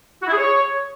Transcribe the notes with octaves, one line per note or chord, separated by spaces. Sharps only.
F#4
E4
G#4
C#5